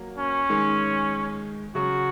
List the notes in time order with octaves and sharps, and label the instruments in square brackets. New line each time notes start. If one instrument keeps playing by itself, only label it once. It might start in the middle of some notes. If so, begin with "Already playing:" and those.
Already playing: [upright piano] F#3 A#3
[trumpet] C#4
[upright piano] D#3 G#3
[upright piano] C#3 F#3 [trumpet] F#4